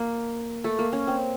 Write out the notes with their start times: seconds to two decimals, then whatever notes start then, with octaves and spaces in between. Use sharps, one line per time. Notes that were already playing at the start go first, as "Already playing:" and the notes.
Already playing: A#3
0.64 A3
0.79 A#3
0.93 C#4
1.07 C4